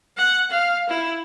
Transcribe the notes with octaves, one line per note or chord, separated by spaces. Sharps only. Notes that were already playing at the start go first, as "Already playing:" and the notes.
F#5
F5
E4